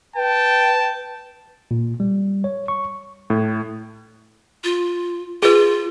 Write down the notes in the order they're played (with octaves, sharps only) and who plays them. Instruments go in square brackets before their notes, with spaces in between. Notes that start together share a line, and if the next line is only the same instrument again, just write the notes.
[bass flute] B4 [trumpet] G5 [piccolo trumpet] A5
[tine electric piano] A#2
G3
C#5
C#6
[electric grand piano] A2
[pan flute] F4
[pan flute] F4 [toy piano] G#4 B4